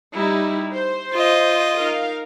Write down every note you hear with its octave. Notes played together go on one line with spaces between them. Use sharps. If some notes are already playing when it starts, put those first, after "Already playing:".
G3 D#4 E4
C5
F4 D#5
D#4 A#4 F5